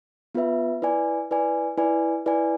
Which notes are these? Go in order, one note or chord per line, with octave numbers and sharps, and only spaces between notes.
B3 F4 B4 E5
E4 B4 D5 G#5
E4 B4 D5 G#5
E4 B4 D5 G#5
E4 B4 D5 G#5